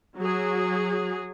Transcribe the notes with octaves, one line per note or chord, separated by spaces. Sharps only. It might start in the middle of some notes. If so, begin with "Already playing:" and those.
F#3 G#4